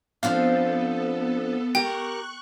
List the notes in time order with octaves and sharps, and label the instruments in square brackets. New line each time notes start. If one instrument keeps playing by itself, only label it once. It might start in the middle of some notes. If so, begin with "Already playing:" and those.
[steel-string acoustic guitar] F3 C4 D4 [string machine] B3 A4 [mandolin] F5
[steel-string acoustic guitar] G4 A#4 [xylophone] G5 [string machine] C#6 F#6